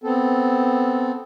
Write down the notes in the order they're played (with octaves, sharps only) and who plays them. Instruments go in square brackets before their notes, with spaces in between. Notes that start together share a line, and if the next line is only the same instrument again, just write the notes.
[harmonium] B3 C4 A4